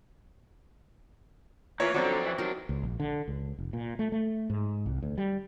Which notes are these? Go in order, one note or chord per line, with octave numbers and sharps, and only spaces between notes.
E3 A#3 F4 A#4 C#5
F2 D3 F#3 C4 C#4 D5 A#5
E3
C3 F#3 D4 D#4 A#4
C#2
A#1
D3
C#2
F1
A#2
A3
A3
G#2
C2
D2
G3